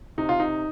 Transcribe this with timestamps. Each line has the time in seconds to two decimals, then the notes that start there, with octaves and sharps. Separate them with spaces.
0.18 C3 D#4
0.29 F4
0.40 D#4